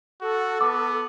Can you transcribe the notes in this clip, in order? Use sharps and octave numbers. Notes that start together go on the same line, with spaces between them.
F#4 A4
B3 D6